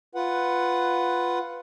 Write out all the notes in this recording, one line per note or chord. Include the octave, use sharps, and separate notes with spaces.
F4 B4 F#5